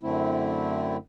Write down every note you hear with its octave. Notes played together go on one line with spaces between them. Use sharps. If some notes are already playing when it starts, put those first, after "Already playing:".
F#2 D3 A3 C4 E4